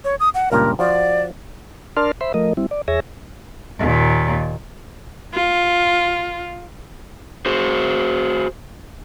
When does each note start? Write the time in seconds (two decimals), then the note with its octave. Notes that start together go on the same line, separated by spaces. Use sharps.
0.04 C#5
0.20 D#6
0.34 F#5
0.51 C#2 G2 A#2 A#4
0.79 F3 F#4 D5
1.97 D4 A#4 D5 A5 C6 F6
2.21 C5 E5 B5 C6
2.34 F3 A3 A#4 D#5
2.57 G3 C4 E4
2.71 D5
2.88 E2 G#4 C#5 E5 G#5 A#6
3.79 D#2 A#2
5.34 F4
7.46 F#4 G#4 C5